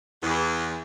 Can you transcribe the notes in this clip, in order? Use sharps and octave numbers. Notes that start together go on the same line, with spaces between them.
E2